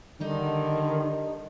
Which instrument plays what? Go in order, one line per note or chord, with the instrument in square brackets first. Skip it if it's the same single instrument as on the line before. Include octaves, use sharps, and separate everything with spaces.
[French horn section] D3 [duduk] D#3 [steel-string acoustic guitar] G3 D#4